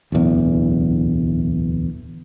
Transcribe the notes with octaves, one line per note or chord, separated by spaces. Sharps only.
D1 B1 E2